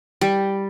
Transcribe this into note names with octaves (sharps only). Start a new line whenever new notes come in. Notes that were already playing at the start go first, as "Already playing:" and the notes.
G3